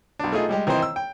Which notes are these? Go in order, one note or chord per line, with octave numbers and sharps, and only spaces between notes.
B1 D4
A3 D#4 F4 G#4
G3 G#3 G4
D#3 E3 C4 D#4 C5
E6
G5